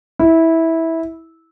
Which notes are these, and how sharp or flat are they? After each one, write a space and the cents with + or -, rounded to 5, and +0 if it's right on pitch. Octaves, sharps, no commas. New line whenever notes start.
E4 -15